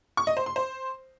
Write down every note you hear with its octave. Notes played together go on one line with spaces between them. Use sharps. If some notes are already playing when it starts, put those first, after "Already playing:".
C#6
D#5
C5
C6
C5